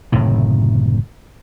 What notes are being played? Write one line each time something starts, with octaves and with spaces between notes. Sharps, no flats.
F#1 A2 C3 D#3